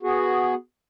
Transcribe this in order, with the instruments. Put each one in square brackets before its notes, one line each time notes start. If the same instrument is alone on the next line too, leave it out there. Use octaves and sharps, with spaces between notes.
[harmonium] B3 F#4 G#4